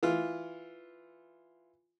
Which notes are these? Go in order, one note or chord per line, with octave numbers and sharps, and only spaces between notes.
E3 F4